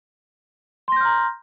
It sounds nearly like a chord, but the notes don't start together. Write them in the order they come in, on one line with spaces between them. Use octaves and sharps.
C6 A#6 G6 F6 A#5